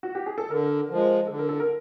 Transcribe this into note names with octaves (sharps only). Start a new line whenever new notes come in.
F#4
G4
G#4
A4
D3 A#4
F3
G#3
D3 A4
A#4
A4
A#4